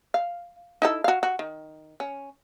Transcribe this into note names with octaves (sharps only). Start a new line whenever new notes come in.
F5
D#4 E4 A4
F#4 F5
F#4
D#3
C#4